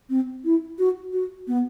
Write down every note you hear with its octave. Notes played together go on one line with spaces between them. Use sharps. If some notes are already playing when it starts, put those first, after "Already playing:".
C4
E4
F#4
F#4
B3